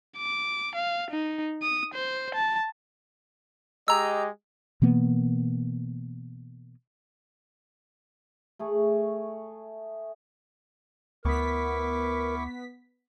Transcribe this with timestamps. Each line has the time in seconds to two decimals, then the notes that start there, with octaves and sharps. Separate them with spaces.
0.18 D6
0.75 F5
1.11 D#4
1.62 D#6
1.94 C5
2.34 A5
3.88 G#3 G4 D#5 A#5 E6
4.82 B2 E3 A#3 B3
8.59 A3 G#4 C#5
11.25 D2 B3 E4 A#4 C#6 D6 B6